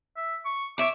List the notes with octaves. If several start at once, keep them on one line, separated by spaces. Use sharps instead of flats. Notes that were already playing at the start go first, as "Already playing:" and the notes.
E5
C#6
C#5 E5 D6